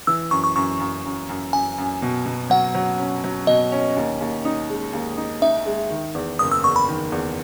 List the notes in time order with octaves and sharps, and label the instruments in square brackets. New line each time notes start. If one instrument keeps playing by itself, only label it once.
[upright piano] E3 [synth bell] E6
[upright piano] F#2 [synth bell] C#6
[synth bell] C#6
[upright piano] F#2 [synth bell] C#6
[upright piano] F#2
F#2
F#2
[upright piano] F#2 [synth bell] G#5
[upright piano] F#2
B2
B2
[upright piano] F#3 [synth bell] F#5
[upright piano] F#3
C#4
F#3
[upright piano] B2 [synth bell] D#5
[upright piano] C#4
D#2
D#2
D#4
G#3
D#2
D#4
[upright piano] D#4 [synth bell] E5
[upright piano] G#3
D#3
E2
[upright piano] F#1 [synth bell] D#6
[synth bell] E6
[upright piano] E2 [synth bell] C#6
[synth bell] B5
[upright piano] D#3
E2